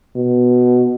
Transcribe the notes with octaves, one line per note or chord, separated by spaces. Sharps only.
B2